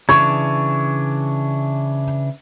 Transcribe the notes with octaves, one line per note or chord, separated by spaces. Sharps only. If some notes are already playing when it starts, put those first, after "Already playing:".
C#3 E3 D4 C#6 G#6